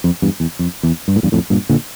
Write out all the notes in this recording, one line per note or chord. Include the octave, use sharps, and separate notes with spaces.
F2
E2 G2
E2
F2
E2
G2
A2
E2 G2
F2 A2
G2 A#2
A#2 D3